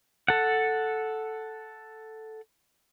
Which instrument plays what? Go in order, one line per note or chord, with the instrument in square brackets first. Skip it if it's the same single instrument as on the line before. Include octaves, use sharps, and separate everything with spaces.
[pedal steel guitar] A4 F#5